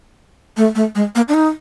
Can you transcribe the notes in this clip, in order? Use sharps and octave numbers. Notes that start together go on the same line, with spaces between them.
A3
A3
G#3
A#3
D4
D#4